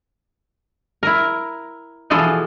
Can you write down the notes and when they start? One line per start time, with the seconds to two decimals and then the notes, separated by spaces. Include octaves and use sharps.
1.03 E4 A#4
2.10 B2 E3 F3 G#4 A4